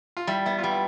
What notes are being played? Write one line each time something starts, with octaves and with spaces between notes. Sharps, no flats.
F4
G3 E4
B3 E4
F4
G3
E4